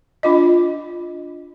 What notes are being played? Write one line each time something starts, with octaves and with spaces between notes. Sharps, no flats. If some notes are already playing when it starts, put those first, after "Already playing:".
D4 F4 D#5